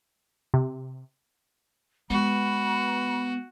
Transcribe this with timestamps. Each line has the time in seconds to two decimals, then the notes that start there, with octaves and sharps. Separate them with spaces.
0.54 C3
2.10 G#3 B3 F#4 B5